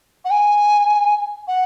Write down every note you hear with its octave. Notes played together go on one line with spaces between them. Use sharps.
F#5
G#5
F#5